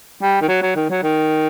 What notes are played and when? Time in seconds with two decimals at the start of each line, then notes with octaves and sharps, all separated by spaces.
0.22 G3
0.42 D#3
0.48 F#3
0.62 F#3
0.76 D#3
0.90 F#3
1.03 D#3